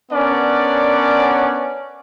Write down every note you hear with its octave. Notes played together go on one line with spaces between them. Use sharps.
B3 C#4 D4 A#4 D5 F#5